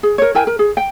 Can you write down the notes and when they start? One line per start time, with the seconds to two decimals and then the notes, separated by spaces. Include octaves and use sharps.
0.03 G#4
0.18 A#4 C#5
0.35 E4 A#4 G5 G#5
0.47 A#4
0.59 G#4
0.77 G5